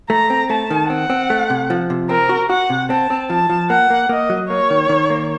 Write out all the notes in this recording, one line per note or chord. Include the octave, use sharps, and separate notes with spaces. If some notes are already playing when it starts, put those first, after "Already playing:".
A3 A#5
C4
A3 A5
D#3
C4 F#5
C4
A3
C3
F3
C3
C4 A#4
F#4
F#4 F#5
C3
C4 A5
C4
F3 A5
F3
A#3 F#5
A#3
A#3 D#5
F#3
A#3 C#5
D#3
D#3
A#3